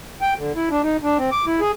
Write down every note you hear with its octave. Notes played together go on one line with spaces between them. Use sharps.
G5
D3
E4
D4
D#4
D4
C4
D6
E4
G#4